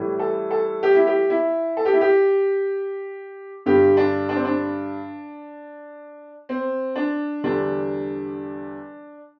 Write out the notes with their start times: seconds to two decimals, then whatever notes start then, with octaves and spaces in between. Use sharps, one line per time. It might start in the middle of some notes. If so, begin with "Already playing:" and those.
Already playing: A2 E3 G3
0.19 A4
0.51 A4
0.83 G4
0.95 E4
1.07 G4
1.30 E4
1.77 A4
1.85 G4
1.93 E4
2.01 G4
3.66 G2 D3 G3 G4
3.97 D4
4.29 D4
4.36 C4
4.45 D4
6.49 C4
6.96 D4
7.44 E2 D3 G3 D4